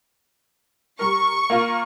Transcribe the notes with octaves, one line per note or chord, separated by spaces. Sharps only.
G3 A#4 C#6
A#3 F4 A#4